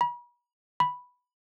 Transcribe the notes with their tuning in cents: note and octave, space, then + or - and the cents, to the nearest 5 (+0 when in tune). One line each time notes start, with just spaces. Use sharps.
B5 -40
B5 +0